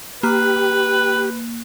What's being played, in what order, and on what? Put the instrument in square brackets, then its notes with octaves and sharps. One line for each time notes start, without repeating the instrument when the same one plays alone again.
[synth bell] A#3 F#6 [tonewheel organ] G4 [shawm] B4